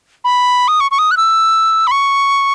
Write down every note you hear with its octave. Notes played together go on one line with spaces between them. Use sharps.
B5
D#6
C#6
C#6
D#6
F#6
E6
B5
C#6